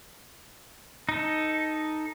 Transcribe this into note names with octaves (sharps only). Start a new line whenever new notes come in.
D#4 A4